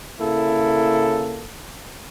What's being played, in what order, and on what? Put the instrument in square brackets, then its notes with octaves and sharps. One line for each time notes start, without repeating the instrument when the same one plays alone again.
[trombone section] C#3 A#3 E4 A4